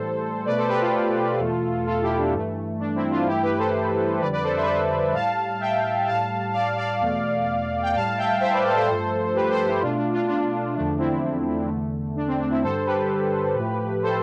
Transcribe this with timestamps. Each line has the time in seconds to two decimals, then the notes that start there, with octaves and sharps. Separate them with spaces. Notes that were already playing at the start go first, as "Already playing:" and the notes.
Already playing: A2 E3 G3 A4 C5
0.45 B2 A3 B4 D5
0.57 A4 C5
0.69 G4 B4
0.81 F4 A4
1.39 E2 B2 A3
1.86 F4 A4
2.02 E4 G4
2.17 D4
2.32 G2 E3 A3
2.79 D4
2.95 C4 E4
3.11 D4 F4
3.27 G2 E3 A3 E4 G4
3.42 G4 B4
3.58 A4 C5
4.20 F2 D3 G3 B4 D5
4.32 B4 D5
4.43 A4 C5
4.55 C5 E5
4.62 B4
4.67 A4 C5
5.14 A2 G3 F5 A5
5.60 E5 G5
6.07 A2 G3 F5 A5
6.53 D5 F5
6.78 D5 F5
7.01 E2 B2 A3
7.82 G5
7.95 A2 G3 F5 A5
8.18 E5 G5
8.41 C5 E5
8.52 B4 D5
8.64 A4 C5
8.76 A4 C5
8.88 G2 F3 A3
9.35 G4 B4
9.51 A4 C5
9.65 E4 G4
9.81 B2 A3 D4 F4
9.97 D4
10.13 D4 F4
10.28 D4
10.74 E2 D3 F3 A3 D4
10.98 C4 E4
11.68 E2 D3 A3
12.16 D4
12.27 C4
12.39 D4
12.50 C4 E4
12.62 G2 D3 G3 A4 C5
12.86 G4 B4
13.55 A2 F3 A3
14.02 A4 C5